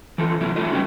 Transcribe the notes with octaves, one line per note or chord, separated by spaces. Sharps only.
E3 F3 A4
C3 F#3 A#3 E4 A#4
A3 E4 F4 A4 D#5
G3 C#4 F#4 G4 B4 G5